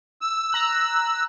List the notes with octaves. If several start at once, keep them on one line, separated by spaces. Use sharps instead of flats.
E6
A#5 F#6